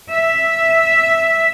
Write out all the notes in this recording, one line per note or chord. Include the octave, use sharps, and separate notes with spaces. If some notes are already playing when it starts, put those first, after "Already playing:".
E5